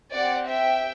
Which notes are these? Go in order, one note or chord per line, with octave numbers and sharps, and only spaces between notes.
C4 G4 D5 F#5
E5 G5